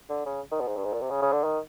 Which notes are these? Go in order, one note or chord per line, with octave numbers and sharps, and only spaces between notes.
D3
C#3
D#3
B2
G#2
G2
G#2
A#2
C3
C#3
C#3
D3
D#3